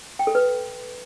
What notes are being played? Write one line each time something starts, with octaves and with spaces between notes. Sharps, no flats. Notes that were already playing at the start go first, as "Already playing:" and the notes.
G5
A4
B4